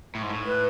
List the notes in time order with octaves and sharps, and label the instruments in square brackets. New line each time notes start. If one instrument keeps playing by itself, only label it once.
[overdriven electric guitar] A2
G#2
A2
[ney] B4